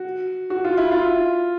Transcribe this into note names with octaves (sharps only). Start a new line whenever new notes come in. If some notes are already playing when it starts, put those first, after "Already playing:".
Already playing: F#4
F#4
F4
E4
F4